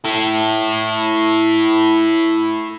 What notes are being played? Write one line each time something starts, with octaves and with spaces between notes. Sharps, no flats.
E4 A4